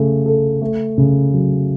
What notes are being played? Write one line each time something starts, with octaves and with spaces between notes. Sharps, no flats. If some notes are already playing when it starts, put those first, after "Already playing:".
Already playing: C#3 A3
A4
A3
C#3
F#3